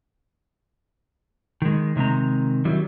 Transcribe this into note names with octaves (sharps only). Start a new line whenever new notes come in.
D#3 G#3
C3 D#3 G#3 C4 A#5
D#3 F#3 G3 E4